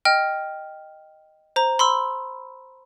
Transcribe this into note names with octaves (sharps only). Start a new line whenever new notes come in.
D#5 G5 F6
C5 A#5
B5 C6 E6